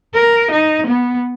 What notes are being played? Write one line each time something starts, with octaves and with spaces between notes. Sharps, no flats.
A#4
D#4
B3